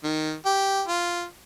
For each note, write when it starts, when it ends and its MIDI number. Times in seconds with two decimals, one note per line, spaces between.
0.04 0.33 51
0.46 0.82 67
0.88 1.24 65